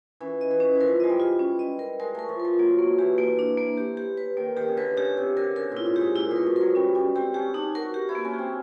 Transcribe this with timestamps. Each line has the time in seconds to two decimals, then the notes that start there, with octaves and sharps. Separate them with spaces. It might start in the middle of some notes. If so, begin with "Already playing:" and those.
0.20 E3 C#4
0.41 D#5
0.51 E3
0.60 C#4
0.75 E3
0.80 F3 A#4
1.00 G#3 D#5
1.10 G3
1.20 F4
1.39 C#4
1.59 D#5
1.79 A#4
1.99 G#3 A#4
2.15 A3 A#4
2.29 F3
2.40 F3 A#4
2.59 F#3 A#3
2.79 A#3
2.98 E3 G4
3.18 A#3
3.39 D4
3.57 A#3
3.77 G4
3.97 G4
4.17 B4
4.37 D#3 A#3
4.57 D#3 G4
4.68 C#3
4.77 D3 B4
4.97 C#3 G4
5.17 C3 G4
5.37 D3 A#4
5.56 C#3 A#4
5.72 A#2 E4
5.86 G#2
5.96 G4
6.01 G#2
6.16 A#2 E4
6.31 B2 A#4
6.46 F3
6.56 F#3 A#4
6.75 G3 C#4
6.95 G3 C#4
7.15 C4 G4
7.34 C#4 G4
7.54 D4 D#4
7.75 F#4 A#4
7.94 G4
8.09 E4
8.15 A#3
8.24 C#4
8.34 G4
8.39 C4